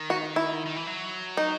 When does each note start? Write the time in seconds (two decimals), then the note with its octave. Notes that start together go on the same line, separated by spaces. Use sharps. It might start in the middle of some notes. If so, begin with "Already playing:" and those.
Already playing: D#3
0.10 F#4
0.36 E4
0.66 D#3
0.76 E3
0.87 F#3
1.37 D#4